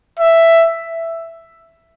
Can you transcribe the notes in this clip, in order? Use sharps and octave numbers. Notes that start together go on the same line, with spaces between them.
E5